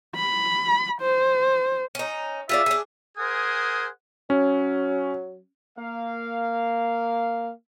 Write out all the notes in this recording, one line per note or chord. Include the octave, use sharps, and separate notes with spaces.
B5
C5
C#4 D#4
F4 G#4 D5 E5
D4 G#4
G#4 A#4 C5 F#5 G#5 D#6
F#3 C#4
A#3 F5